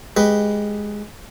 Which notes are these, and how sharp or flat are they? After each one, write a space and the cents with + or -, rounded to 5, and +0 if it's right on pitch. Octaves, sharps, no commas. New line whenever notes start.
G#3 +0 G4 +0 B4 +0